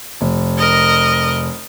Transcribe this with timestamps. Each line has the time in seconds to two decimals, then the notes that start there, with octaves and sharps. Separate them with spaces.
0.21 F1
0.58 A#4 D#5